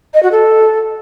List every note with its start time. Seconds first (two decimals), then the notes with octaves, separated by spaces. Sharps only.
0.14 D#5
0.23 F#4
0.32 A4